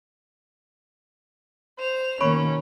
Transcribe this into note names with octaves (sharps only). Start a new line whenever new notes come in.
C5 F7
B2 D#3 A#3 C#4 C#5 B5 C#6